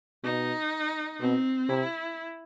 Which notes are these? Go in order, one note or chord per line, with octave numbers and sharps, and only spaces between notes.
B2 D#4
B2 C4
C3 E4